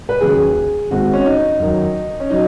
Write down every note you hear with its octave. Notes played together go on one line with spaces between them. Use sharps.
B4
D#2 C#3 F#3 G#4
G#1 G#2 G#3 F#4
C#4
D#4
F#2 D#3 F#3
C#4
F#3 D#4